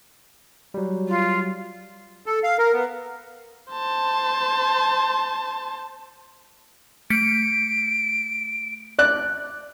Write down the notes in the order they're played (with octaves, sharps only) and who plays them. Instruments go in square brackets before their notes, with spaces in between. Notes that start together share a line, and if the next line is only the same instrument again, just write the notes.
[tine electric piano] F#3 G3
[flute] F4
[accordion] A4
F5
A#4
B3
[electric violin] C5 A5
[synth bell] A3 B6 C#7 [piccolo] D7
[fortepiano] D5 F#6